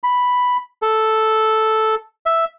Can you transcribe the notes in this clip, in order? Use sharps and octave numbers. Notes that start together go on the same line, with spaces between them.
B5
A4
E5